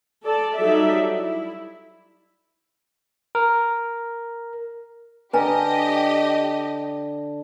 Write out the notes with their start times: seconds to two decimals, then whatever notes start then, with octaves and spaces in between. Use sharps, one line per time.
0.24 A4 D5 A5
0.57 F#3 G3 D#4 A4 D5 E5
1.15 E4
3.35 A#4
5.33 D3 G4 B4 D#5 G#5 A#5